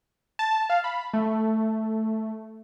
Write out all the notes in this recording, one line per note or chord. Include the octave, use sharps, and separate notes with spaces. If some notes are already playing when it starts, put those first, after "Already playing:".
A5
F5
B5
A3